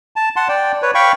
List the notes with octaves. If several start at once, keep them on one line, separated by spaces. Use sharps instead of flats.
A5
F#5 A5 C6
D5 G5
B4 C#5
F5 G5 B5 C#6